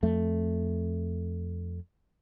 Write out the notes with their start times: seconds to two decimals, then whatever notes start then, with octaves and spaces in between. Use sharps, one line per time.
0.03 F2 A3